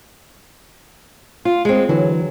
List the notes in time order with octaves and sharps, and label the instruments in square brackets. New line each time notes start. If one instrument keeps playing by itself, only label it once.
[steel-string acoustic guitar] F4
G#3 C4
[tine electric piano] D3 E3 [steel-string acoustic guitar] F#3